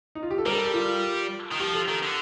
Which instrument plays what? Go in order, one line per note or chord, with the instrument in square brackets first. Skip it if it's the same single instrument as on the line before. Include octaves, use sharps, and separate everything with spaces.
[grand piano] D#4
F4
G4
A4
[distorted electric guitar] G3 [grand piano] A#4
[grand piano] A4
G4
F4
[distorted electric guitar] D#3
[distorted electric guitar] F3 [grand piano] G4
[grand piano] A4
[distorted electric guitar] D#3
D3